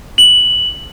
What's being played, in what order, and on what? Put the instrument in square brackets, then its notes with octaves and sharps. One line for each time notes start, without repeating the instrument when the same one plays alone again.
[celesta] F#7